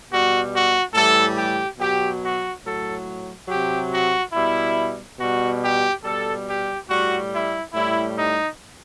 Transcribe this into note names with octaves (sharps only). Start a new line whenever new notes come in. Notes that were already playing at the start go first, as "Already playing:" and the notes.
B2 G3 F#4
F#4
A2 E3 G3 A4
G4
B2 F#3 G4
F#4
A2 F#3 A4
C3 F#3 G4
F#4
B2 G3 E4
B2 G3 F#4
G4
B2 G3 A4
G4
A2 G3 F#4
E4
A2 G3 E4
D#4